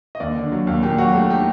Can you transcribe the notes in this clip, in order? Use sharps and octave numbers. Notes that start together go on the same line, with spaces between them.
D#5
D#2 D5
D3
F#3
D#2
A#2 G4
F#3 F#4
A3 G4
D#4 G4